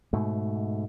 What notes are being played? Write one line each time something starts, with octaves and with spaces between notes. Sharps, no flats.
G#2 B2 A3